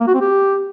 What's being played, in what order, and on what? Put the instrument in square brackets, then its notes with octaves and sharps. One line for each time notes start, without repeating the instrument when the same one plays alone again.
[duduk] A#3
F#4
C4
G4